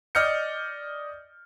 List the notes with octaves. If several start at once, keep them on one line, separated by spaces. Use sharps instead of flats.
D5 D#5 F6 G6 C#7